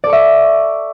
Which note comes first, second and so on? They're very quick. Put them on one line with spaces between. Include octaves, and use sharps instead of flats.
D5 A4 C#6 E5